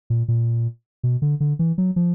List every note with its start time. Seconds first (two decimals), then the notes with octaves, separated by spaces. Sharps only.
0.10 A#2
0.28 A#2
1.03 B2
1.22 D3
1.40 D3
1.59 E3
1.78 F#3
1.96 F3